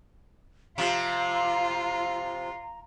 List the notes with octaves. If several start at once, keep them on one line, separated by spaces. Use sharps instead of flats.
C3 F3 F4 A#5